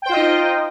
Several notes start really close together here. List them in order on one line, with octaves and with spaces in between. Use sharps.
G5 C5 F4 D#5 D#4